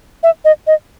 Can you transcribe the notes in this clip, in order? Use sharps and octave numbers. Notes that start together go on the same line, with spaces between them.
E5
D#5
D#5